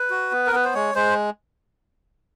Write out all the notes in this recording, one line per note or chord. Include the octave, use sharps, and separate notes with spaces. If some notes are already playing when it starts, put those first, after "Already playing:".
Already playing: B4
F#4
B3
A#4
B3 B4
C5
G#3 C#5
G#3 C5